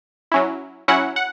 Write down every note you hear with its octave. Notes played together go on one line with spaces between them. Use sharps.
F#3 C#4 E4
F#3 C#4 E4 F#5
F#5